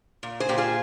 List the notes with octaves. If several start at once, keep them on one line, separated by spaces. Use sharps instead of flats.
A#2
G#4 C5
A#2 G4
F4 G#4